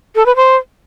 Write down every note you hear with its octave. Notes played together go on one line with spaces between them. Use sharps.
A4
B4
C5